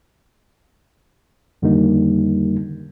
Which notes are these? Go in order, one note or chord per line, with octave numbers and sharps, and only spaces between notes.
F2 D3 D#3 G3 A#3 D#4